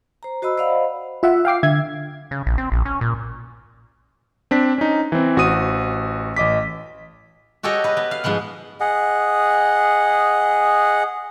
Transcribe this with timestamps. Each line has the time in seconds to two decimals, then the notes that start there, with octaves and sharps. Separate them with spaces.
0.23 C5 A#5
0.42 F#4 C5 D#5 B5 E6
0.58 C5 D5 D#5 F5 F#5 B5
1.23 F4 E5 F#5
1.45 F5 G5 D6 C7
1.63 D3 E5 G#6
2.31 C#3
2.47 A#1
2.58 C4
2.72 A#1
2.85 C#4
3.01 A#2
4.51 C4 D4 B6
4.78 C#4 D#4
5.12 E3 C4
5.37 A1 F#4 C5 D#6 D#7
6.36 A1 D#5 D6 B6
7.63 F#4 G4 A4 C#5 D#5
7.84 B4 D#5
7.97 B3
8.11 F5
8.24 G#2 F3 B3 F#5
8.80 G#4 D#5 F#5